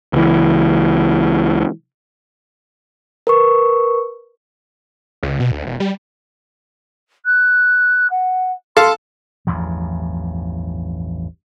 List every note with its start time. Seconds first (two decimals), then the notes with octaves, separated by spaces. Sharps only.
0.13 C#2 E3
3.27 A#4 B4 C#6
5.23 C#2
5.40 B2
5.51 D2
5.66 E1
5.80 G3
7.25 F#6
8.10 F#5
8.77 A4 F5 C6
9.47 A1 E2 G2 F3